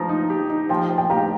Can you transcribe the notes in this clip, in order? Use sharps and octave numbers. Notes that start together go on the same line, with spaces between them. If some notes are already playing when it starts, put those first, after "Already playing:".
Already playing: F3 A#5 D#6
D#4
G4
D#4
F3 G5 C6
F3
G5
G4 F5 A#5